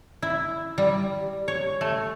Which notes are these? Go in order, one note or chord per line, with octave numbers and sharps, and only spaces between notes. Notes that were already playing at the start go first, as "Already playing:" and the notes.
E4
G3
C#5
A3